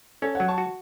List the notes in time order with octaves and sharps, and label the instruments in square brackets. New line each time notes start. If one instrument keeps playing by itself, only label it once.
[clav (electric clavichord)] C#4 [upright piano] A4 C#5
[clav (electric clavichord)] F#3 [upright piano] C#5 F#5
[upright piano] A5 C#6
[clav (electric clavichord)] F#4